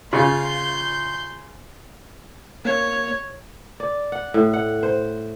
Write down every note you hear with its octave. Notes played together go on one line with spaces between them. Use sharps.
C#3 F4 C6 G6
A#3 C#5
D5
F#5
A2
F#5
C5